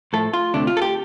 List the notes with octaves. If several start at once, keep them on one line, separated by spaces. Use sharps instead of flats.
A2 F3 A3 A4
F4
D2 C3 A3 C4 D4
F4
A4
G4